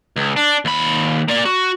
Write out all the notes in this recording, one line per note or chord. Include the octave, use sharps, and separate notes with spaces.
C#2
D4
D#2 B5
A#3 D5
F#4